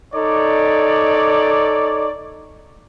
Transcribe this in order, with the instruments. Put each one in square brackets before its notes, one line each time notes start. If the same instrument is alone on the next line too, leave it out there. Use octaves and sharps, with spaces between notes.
[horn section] D#4 A4 C#5 D5